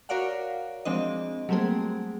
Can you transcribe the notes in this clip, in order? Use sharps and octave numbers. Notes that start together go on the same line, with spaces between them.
F#4 A#4 C#5 D5 F5 F#5
F3 G#3 C4 D4 D#5
F#3 G3 A3 A#3 C4 G#4